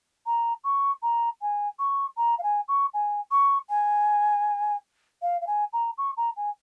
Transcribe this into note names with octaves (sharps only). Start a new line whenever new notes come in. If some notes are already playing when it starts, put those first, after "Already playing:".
A#5
C#6
A#5
G#5
C#6
A#5
F5
G#5
C#6
G#5
C#6
G#5
F5
F5
G#5
A#5
C#6
A#5
G#5